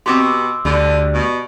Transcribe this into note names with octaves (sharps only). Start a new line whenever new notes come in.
B2 C4 F#4 G4 C6 D6 E6
D2 D3 G3
B2